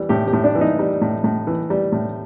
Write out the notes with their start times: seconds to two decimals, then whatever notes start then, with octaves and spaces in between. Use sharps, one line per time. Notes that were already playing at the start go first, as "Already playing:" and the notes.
Already playing: E3 G3
0.09 A2 G4
0.27 G4
0.33 A2
0.44 D4
0.55 E3
0.61 D#4
0.79 G3
1.02 A2
1.24 A2
1.47 E3
1.70 G3
1.92 A2